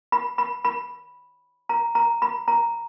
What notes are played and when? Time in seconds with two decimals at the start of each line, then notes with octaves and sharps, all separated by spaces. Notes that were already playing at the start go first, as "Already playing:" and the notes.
0.12 B5
0.38 B5
0.65 B5
1.69 A#5
1.95 A#5
2.22 B5
2.48 A#5